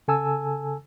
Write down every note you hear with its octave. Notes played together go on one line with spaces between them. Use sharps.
C#3 A4 G#5 A5 E6